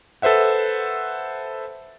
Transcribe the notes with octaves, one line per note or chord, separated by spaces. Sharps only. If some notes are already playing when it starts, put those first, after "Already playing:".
A4 B4 C5 E5 F#5